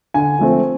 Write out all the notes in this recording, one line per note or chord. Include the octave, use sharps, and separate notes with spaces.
D3 G#5
F3 A3 C4